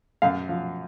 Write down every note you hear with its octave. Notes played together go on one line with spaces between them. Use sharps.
F#2 F5
F3